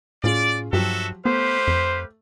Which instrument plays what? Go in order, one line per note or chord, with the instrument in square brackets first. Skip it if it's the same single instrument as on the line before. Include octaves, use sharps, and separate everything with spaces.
[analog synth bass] A2 [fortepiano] C#4 F4 G#4 [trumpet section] D5
[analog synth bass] G2 [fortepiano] F3 F#3 G4 [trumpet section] F#4 A4 E5
[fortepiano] A3 [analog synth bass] B3 [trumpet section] G4 B4 F5 [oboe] C5
[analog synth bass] F2